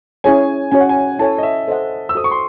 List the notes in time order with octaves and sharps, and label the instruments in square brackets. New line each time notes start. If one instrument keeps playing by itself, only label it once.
[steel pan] C#4 E4 G#4 C#5 [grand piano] G#5
[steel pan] C#4 F#4 C#5 [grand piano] G#5
[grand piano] F#5
G#5
[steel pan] E4 A4 C#5 G#5 [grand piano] A5
[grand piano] D#5
E5
[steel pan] A4 C5 D#5 F#5
[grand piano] E6
[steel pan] F#4 A4 C5 [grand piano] D#6
[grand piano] C#6
C6